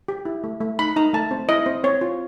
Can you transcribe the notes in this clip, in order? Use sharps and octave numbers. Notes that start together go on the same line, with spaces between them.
G4
E4
A3
A3
D#4 B5
D#4 A#5
A3 A5
C4
E4 D#5
C4
C4 C#5
F4